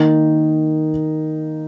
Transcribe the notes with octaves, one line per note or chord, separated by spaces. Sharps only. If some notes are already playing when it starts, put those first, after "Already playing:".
Already playing: D#3 A#3 D#4